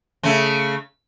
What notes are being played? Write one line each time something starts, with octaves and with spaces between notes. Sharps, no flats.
C#3 A3